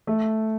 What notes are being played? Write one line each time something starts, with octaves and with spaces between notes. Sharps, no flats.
A3